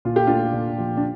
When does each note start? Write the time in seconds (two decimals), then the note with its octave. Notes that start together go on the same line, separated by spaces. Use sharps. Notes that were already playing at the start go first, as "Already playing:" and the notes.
0.05 A#2 F4
0.16 G4
0.27 A3 D4 F4
0.54 A#2
0.78 F3
0.97 D4